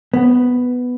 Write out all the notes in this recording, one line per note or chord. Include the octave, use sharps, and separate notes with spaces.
B3